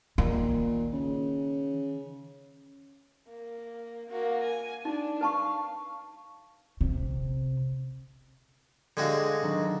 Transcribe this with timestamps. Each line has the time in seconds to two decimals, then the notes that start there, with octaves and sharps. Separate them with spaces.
0.18 A#2 D#3
0.93 C#3
3.28 A#3
4.10 A#3 F#4
4.42 G#5
4.85 D4 D#4
5.21 B4 F5 A5 C#6
6.81 C3
8.97 D3 G#3 F#4 G4 F5
9.42 D#3 F#3 D4